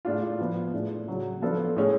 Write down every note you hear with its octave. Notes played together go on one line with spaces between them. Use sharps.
A2 G#3 D4 F4
F3 B3 F4
A2 G#3 D4
C#3 F#3 C#4 F#4
F3 B3 D4 F4 A4
A2 G#3 C#4 G#4